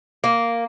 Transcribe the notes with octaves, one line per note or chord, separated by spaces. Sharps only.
A#3